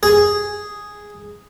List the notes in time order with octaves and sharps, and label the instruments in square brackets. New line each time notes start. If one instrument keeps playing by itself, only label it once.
[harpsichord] G#4